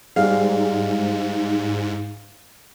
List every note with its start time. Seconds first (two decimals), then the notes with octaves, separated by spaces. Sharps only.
0.16 G#2 G3 G#4 F5